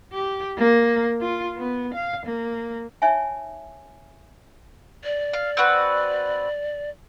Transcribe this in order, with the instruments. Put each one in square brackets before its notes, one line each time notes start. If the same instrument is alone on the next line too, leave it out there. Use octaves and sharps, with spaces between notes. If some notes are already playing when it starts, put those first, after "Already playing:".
[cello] G4
A#3
F4
B3
F5
A#3
[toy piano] D#4 C#5 E5 G#5
[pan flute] D5
[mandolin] F5
C4 F#4 B4